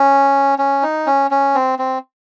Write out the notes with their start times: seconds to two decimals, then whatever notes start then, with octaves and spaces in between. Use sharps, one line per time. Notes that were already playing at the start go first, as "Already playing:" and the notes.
Already playing: C#4
0.59 C#4
0.83 D#4
1.07 C#4
1.31 C#4
1.55 C4
1.79 C4